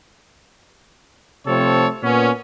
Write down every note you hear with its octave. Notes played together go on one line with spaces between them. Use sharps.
C3 F3 A3 C4 A4 C#5
A#2 B3 C#4